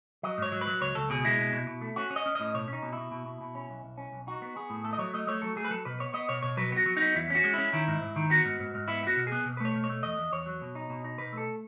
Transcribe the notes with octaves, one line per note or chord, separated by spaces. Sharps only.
F#3 D#5
G#2 C#5
F#3
B4
F#3
C#2 C#5
C#2 A4
B2 G#4
G#3 E4
B2
B2
B2
A3
C#4 F#4
C#4
D#5
C#4
A2 D#5
B2 C#5
C#4
D#4
B2
B2 E4
B2
B2
B2
C#4
B1
B1
C#4
B1
D#4 F#4
B3
B3 G#4
A2
A3 A4
D#5
F#3 C#5
A3 D#5
A3 C#5
F#3 A4
A3 G#4
B4
F#3 A4
B2 B4
B3 C#5
B3 D#5
B2 C#5
B2 C#5
F#3 B4
B3 F#4
F#3
B3 D#4
E2 E4
C#4 F#4
G#3
C#4 E4
D#3 E4
G#2
G#2
D#3
B3 F#4
G#2
G#2
G#2
B3 E4
B3 F#4
B2
G#4
B3
B2
B4
A3 C#5
B2
C#5
A3
E2 D#5
E2
E2 C#5
F#3
B2
D#4
B2
D#4
B2 B4
A3 A4